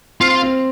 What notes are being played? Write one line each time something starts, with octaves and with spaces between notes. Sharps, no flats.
C4 F4
C4